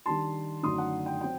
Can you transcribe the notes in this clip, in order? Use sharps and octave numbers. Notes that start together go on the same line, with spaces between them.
D#3 G3 D4 A5 C6
F#2 D3 A3 D#4 C6 D#6
F#5
G5
F#3 C4 G5